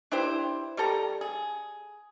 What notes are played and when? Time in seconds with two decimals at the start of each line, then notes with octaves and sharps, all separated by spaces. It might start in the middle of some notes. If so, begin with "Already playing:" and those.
0.12 D4 E4 G4 C5
0.77 G3 G4 A4 A#5
1.21 G#4